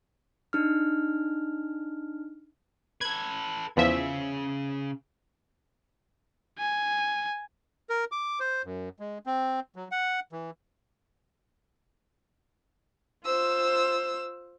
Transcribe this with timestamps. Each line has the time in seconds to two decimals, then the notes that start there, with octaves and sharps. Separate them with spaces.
0.53 D4 D#4 F6
3.01 A4 B4 G#6
3.77 E2 C#3 F3 E5
6.59 G#5
7.90 A#4
8.12 D6
8.40 C5
8.65 F#2
9.00 G#3
9.26 C4
9.76 F#3
9.91 F#5
10.33 E3
13.25 F4 C5 E6